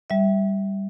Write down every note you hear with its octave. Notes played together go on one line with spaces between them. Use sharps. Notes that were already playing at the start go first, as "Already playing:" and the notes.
G3 E5